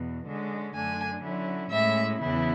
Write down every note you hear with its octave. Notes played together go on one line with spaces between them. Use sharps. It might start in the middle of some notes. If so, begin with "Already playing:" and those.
Already playing: E2 B2
D3 G#3 C#4
F#2 D3 A3 D4 G#5
D3 F#3 C#4 E4
A2 G#3 C#4 E4 E5
E2 C#3 E3 B3 E4